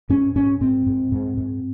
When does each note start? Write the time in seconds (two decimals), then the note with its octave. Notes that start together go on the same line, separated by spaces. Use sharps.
0.09 G#2 C#4
0.36 G#2 C#4
0.61 G#2 C4
0.86 G#2
1.12 G#2
1.37 G#2